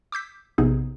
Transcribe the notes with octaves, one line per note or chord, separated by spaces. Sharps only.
D6 E6 G6 B6
A#1 C3 B3 D#4 G#4